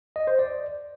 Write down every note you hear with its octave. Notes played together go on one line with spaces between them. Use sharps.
D#5
C5
D5